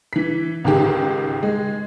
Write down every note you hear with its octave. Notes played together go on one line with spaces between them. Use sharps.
E3 B6
C#2 G#2 D#3 G4
G#3